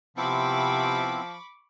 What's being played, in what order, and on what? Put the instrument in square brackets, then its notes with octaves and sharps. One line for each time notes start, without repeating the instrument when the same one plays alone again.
[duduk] C3 [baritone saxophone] F3 [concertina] B3 C4 E4 [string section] B5 C#6 D6